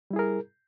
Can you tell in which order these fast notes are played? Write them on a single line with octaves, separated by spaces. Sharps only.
G3 E4 G#4 A#4